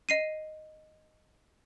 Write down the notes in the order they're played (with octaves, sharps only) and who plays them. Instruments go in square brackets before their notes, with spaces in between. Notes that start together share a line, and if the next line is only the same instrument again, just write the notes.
[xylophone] D#5 C7 D#7